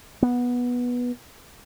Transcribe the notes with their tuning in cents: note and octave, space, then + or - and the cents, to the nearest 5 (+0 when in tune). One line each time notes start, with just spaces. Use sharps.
B3 -10